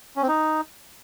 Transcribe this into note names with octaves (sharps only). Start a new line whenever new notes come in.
C#4
C4
D#4